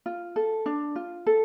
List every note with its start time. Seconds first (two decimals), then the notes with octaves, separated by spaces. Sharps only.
0.06 F4
0.36 A4
0.66 D4
0.96 F4
1.27 A4